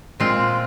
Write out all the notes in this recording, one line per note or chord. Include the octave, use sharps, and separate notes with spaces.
A#2 G#3 C4 F4